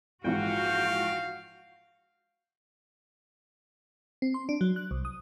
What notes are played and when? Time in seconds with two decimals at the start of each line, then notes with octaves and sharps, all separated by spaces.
0.24 A#1 G#2 E3 F#4 F5 G5
4.22 C4
4.34 C6
4.49 D4
4.61 F#3
4.76 F#6
4.91 C2
5.05 D#6